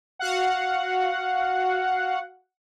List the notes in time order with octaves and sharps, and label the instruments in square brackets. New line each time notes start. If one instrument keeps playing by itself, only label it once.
[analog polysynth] F#4 F5 F#5